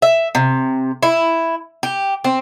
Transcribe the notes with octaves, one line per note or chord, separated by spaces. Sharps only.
E5
C3
E4
G4
C4